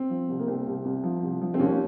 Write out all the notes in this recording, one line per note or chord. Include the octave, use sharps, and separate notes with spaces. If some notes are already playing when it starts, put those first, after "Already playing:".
Already playing: C4
F3
C2
A#3
C2 C4
C2
C2
F3
C2
F3
C4
D#2 C#4